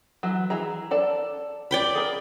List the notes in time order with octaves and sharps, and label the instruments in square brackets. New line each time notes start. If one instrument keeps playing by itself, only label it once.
[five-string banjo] E3 F#3
E3 G#4 A#5
A4 D5 A5
[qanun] D5 G5 B5
[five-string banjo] G#4 A#4